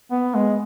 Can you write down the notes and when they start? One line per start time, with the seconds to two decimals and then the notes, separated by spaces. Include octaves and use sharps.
0.11 B3
0.34 G#3